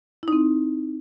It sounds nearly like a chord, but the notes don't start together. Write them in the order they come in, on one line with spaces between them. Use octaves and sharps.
E4 D#4 C4